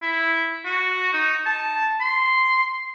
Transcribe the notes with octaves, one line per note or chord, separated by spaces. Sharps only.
E4
F#4
D#4
A5
C6